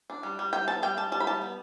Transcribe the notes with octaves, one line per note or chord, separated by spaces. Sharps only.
D4
G3
G3
G3 G5
B3 A5
G3 G5
G3 A5
G3 A5
B5
G3 A5
B3